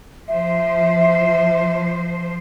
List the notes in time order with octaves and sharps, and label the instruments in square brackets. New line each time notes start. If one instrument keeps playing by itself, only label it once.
[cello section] F3 C5 [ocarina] E5